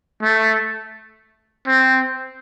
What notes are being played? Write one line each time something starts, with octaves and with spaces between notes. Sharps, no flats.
A3
C4